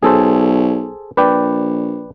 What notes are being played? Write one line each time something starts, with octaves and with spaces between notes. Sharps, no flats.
B1 G#4 A4 C5
A#1 B4 D5 G5